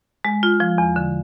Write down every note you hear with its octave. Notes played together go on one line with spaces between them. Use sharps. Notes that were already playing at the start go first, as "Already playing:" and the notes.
G#3
F4
F3
E2
D3